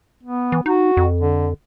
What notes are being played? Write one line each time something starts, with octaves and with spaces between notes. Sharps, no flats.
B3
E3
D#4 F#4
F2
D3